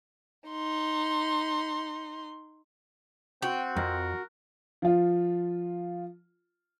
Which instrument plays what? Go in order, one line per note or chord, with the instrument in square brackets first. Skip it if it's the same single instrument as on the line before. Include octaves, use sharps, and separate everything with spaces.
[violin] D#4 C6
[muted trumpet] C4 [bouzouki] F#4 [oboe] G5
[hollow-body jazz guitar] F2 [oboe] A#4
[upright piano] F3 F4